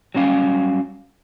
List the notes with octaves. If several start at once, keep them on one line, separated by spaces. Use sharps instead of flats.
F#3 G3 C#4 F5